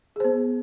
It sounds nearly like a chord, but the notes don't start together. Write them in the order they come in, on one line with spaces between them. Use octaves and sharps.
G#4 C5 B3